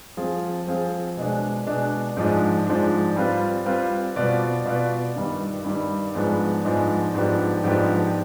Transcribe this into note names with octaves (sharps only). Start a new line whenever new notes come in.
F3 C4 F4 G#4
F3 C4 F4 G#4
B2 G#3 D4
B2 G#3 D4
G#2 F3 G#3 D4
G#2 F3 G#3 D4
G3 C4 F4 B4
G3 C4 F4 B4
B2 B3 F4 B4 D5
B2 B3 F4 B4 D5
G2 D#3 G3
G2 D#3 G3
G#2 F3 G#3 B3 D4
G#2 F3 G#3 B3 D4
G#2 F3 B3 D4 G4
G#2 F3 B3 D4 G4